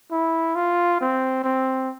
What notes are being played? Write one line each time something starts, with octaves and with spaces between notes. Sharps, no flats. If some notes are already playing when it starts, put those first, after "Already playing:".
E4
F4
C4
C4